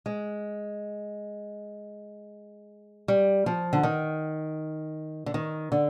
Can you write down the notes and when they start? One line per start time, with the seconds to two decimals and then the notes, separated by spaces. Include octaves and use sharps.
0.06 G#3
3.08 G3
3.46 F3
3.73 D3
3.83 D#3
5.26 D3
5.34 D#3
5.72 D3